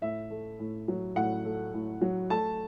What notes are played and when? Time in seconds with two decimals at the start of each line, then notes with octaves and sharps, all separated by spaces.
0.02 A2 E5
0.30 A3
0.59 A2
0.88 F#3
1.16 A2 F#5
1.45 A3
1.73 A2
2.01 F#3
2.30 A3 A5